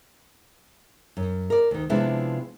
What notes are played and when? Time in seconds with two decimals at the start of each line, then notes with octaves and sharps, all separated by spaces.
1.17 F#2
1.50 A#4 D5
1.71 D2 D#3
1.90 C3 F3 G#3 B3 D4 E4